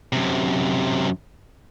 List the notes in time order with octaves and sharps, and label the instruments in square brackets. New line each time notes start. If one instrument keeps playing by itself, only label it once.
[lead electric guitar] F#2 C3